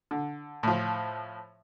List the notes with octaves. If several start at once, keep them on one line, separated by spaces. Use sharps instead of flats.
D3
A2 F3